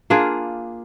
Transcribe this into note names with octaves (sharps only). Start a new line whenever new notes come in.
A#3 D4 F4 G#4